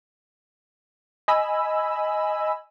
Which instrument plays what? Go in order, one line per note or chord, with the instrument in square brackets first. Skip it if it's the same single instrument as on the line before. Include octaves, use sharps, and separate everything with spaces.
[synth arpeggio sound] D#5 G#5 B5 E6